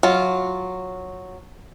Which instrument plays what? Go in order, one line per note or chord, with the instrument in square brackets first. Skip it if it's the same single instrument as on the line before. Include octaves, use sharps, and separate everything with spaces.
[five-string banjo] F#3 F4